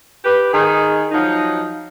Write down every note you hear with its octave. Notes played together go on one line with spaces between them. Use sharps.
G4 B4
D#3 G#4
F3 F#3 D#4